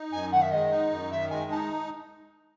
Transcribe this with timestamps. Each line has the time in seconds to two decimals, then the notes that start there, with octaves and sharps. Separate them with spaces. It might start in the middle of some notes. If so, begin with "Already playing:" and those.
Already playing: D#4
0.12 F#2 G#5
0.32 D#3 F#5
0.42 E5
0.51 G#3 D#5
0.71 D#4
0.91 F#2
1.10 D#3 E5
1.30 G#3 G#5
1.51 D#4 A5